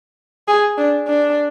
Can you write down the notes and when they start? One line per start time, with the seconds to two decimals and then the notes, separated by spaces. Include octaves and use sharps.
0.48 G#4
0.78 D4
1.07 D4